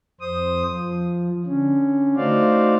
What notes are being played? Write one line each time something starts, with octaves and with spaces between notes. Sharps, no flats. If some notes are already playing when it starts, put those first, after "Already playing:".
F2 C5 D#6
F3
D3 C#4
A3 D#4 F#4 C5 D5 F5